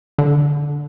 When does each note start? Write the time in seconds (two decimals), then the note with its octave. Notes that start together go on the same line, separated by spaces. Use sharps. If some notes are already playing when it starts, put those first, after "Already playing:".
0.18 D3